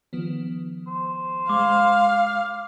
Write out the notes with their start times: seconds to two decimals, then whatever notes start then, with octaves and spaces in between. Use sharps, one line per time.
0.13 D#3 F3 B3
0.87 C5
1.49 G#3 F5 D6